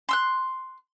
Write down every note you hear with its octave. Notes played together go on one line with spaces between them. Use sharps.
C6 E6 F#6